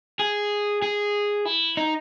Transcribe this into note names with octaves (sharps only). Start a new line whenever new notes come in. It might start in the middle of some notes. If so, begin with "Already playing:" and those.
G#4
G#4
E4
D#4